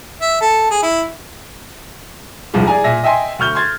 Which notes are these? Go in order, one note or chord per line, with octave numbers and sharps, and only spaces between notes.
E5
A4
G#4
E4
D#1 C2 G2 F3 G#3 E4
G#4 D5 G#5 A#5
A#2 E5 G#5 A#6
D#5 E5 G5 G#5 C6
D2 C#6 F6 G6 G7
C6 G#6 A6